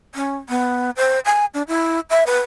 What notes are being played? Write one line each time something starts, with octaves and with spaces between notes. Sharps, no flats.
C#4
B3
C5
G#5
D4
E4
E5
B4